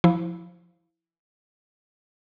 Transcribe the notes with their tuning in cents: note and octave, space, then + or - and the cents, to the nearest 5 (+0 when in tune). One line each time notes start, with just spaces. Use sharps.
F3 +0 E4 +0